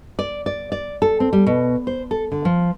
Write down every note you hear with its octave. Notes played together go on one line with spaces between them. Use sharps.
D5
D5
D5
A4
C4
G3
B2
C5
A4
D3
F3